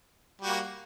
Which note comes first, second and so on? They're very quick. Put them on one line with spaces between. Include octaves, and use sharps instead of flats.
G3 F#4 A#3